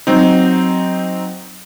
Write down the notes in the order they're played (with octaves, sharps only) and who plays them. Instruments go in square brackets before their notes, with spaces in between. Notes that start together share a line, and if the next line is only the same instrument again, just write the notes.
[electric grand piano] F#3 C4 D#4